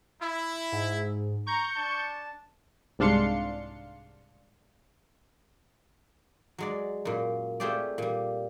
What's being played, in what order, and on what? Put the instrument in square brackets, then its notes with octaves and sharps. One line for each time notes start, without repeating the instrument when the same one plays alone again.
[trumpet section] E4
[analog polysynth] G#2
[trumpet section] A#5 [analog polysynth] C#6 G6 C#7
[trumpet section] D4 A5
[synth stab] C2 G#2 D4 F5 C6 C#7
[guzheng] F#3 G#3 D5
F#2 A#2
A3 C4 F4 G4 G#4 D5
A#2 G3